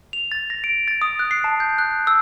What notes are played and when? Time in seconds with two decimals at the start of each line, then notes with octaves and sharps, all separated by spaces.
0.13 F7
0.32 A6
0.50 A#6
0.64 D7
0.88 A6
1.02 D#6
1.19 F#6
1.31 C7
1.44 A5
1.60 G6
1.78 F#6
2.07 E6